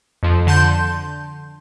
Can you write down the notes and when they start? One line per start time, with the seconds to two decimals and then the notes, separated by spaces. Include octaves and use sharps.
0.23 F2 F3
0.47 D3 A5 C6 G6